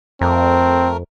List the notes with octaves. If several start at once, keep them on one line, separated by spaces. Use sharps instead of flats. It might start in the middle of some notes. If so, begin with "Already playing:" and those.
F2 A3 C4 A#4